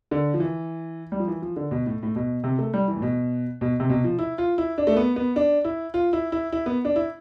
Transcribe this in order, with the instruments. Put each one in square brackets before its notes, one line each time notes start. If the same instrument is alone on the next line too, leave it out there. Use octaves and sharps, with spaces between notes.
[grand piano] D3
F3
E3
G3
F3
E3
F3
D3
B2
A2
A2
B2
C3
A3
G3
E3
A2
B2
B2
C3
B2
F3
E4
F4
E4
D4
A3
B3
B3
D4
E4
F4
E4
E4
E4
B3
D4
E4